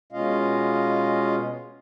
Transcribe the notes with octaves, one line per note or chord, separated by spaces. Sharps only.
B2 G#3 C#4 F4 D#5 F5